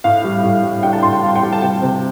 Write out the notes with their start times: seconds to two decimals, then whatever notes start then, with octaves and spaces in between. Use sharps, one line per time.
0.04 A2 F5
0.24 G3
0.43 A2
0.63 G3
0.83 D4 G5
0.93 A5
1.03 A2 C6
1.13 G5
1.22 G3 F5
1.36 G5
1.42 G3
1.53 A5
1.62 C3 G5
1.82 C3